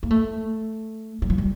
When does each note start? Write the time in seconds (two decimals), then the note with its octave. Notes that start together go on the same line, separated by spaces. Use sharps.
0.03 A#3
0.11 A3
1.22 G3
1.30 F3
1.38 G3